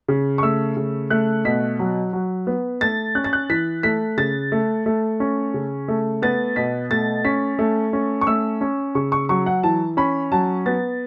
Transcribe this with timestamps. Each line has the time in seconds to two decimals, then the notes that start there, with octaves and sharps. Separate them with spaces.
0.08 C#3
0.38 C#6
0.42 A3 E6
0.77 C#3
1.10 A3 F#6
1.45 B2 B6
1.79 F#3
2.13 F#3
2.47 B3
2.81 A3 A6
3.15 C#4 F#6
3.24 A6
3.33 F#6
3.50 E3 B6
3.83 A3 B6
4.17 C#3 A6
4.52 A3
4.86 A3
5.20 C#4
5.54 C#3
5.88 A3
6.22 B3 A6
6.56 B2 B6
6.91 A3 A6
7.25 C#4 B6
7.59 A3
7.93 C#4
8.21 C#6
8.27 A3 E6
8.61 C#4
8.95 C#3 C#6
9.12 C#6
9.29 F#3 C#6
9.46 F#5
9.63 E3 A5
9.97 C#4 B5
10.32 F#3 A5
10.66 B3 A6